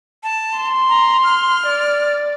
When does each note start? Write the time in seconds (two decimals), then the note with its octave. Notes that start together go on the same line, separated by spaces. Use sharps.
0.23 A5
0.57 C6
0.89 A#5
1.24 F6
1.67 D5